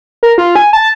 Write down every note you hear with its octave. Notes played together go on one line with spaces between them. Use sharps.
A#4
F4
G#5
A5